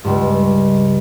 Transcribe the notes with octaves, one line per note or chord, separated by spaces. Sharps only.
C#2 G2